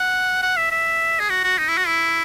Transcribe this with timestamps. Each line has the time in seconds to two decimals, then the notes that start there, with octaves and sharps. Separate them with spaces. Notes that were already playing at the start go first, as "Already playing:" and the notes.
Already playing: F#5
0.42 F#5
0.57 E5
0.71 E5
1.19 G#4
1.29 F#4
1.44 F#4
1.58 D#4
1.68 E4
1.77 F#4
1.87 E4